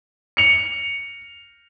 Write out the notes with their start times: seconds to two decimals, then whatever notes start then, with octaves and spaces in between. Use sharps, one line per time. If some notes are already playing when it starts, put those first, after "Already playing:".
0.37 C#7 F7